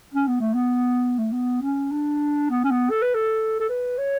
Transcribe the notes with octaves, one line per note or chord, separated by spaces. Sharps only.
C#4
B3
A3
B3
A3
B3
C#4
D4
B3
C#4
B3
A4
B4
A4
A4
B4
C#5